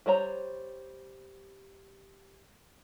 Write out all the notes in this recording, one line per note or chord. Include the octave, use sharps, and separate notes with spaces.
G3 C5 C#5 A#5